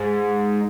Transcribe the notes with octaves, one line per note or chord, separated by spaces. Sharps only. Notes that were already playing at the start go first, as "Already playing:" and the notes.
Already playing: G#2